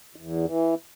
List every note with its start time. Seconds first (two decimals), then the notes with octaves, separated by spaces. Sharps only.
0.16 E2
0.45 E3